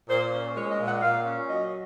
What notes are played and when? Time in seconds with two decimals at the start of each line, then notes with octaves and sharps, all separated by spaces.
0.09 A#2 C5
0.32 C#4
0.55 G#3 C#5
0.71 D#5
0.79 A#2
0.86 F#5
1.01 A#2 F5
1.25 C#4
1.49 F#3 D#5